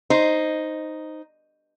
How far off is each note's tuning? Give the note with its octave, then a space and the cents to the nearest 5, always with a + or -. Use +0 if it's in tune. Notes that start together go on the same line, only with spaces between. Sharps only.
D#4 +0 C5 +0